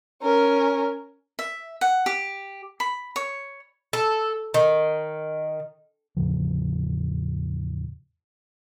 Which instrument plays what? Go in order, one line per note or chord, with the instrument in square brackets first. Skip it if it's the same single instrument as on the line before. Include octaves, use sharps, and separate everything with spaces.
[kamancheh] C#4 A#4
[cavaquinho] E5
F#5
G4
B5
C#5
[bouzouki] A4
D#3
[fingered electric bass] E2 A2 C#3 F3